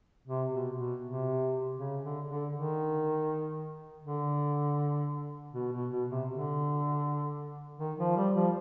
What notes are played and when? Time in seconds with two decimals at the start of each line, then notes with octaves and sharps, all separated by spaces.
0.28 C3
0.52 B2
0.77 B2
1.03 C3
1.78 C#3
2.02 D3
2.29 D3
2.53 D#3
4.03 D3
5.54 B2
5.72 B2
5.91 B2
6.10 C3
6.29 D3
7.79 D#3
7.99 F3
8.17 G3
8.36 F3